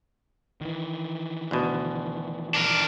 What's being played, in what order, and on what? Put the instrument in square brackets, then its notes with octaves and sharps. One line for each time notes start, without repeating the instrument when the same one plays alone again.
[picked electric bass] D#3 E3
[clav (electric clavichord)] D2 B2
[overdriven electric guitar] D4 A#4